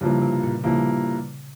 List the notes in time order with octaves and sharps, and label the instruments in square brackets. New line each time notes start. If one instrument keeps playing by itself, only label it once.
[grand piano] G2 F3 A#3 E4 [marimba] C#3
[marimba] C3
A#2
[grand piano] G2 F3 A#3 E4 [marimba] C#3